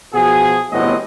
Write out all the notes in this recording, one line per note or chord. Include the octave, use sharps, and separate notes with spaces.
B2 F3 F#4 G#4
G1 A2 B3 C4 F#4 D#5